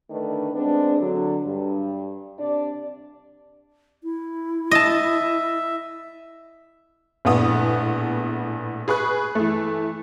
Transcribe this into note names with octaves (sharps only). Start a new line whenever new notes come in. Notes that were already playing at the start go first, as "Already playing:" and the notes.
D3 D#3 A3 D4 B4
G#3 B3 C4 D4
D3 F#3
G2
C3 D4 D5
E4
D#5 E5 A5
A#1 A2 B3 D#6
G#4 B4 C#6 F#6
E3 A3